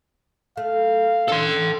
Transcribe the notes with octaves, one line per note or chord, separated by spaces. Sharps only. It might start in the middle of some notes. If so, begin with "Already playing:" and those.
A3 F5
D4 A4 C6